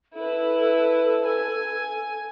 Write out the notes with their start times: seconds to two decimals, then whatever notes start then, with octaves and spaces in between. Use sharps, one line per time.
0.15 E4 A4 B4
1.26 G#5